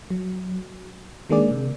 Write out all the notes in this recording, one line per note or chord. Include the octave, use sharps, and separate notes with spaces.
F#3
D#3 G#3 A#3 D4 G#4 D5
C3